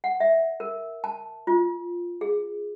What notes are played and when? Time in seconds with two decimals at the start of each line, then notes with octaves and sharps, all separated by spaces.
0.04 F#5
0.20 E5
0.60 A#4
1.04 A5
1.47 F4
2.21 G#4